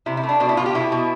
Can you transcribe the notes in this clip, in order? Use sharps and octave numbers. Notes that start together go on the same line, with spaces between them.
C3 E4
E4
A3
D4
B2 D4
E4
B2 F4
G4
B2 E4
B2